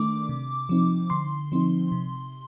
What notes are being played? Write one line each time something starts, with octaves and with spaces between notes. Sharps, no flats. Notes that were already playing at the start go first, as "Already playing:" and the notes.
Already playing: D#3 A3 D4 D6
C3
F3 C4 D#4
D3 C6
F3 C4 D#4
C3